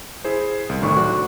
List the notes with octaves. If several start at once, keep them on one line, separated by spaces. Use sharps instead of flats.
E4 G#4 C5
C2
D2 A2 D#3 C#6
F#3 F#4 D5